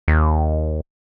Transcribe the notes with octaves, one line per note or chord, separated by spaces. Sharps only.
D#2